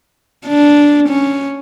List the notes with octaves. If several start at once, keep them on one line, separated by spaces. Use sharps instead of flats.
D4
C#4